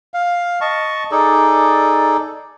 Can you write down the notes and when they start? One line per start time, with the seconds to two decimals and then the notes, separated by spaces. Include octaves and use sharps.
0.14 F5
0.61 D#5 A5 C#6
1.11 D#4 G#4 A4 D5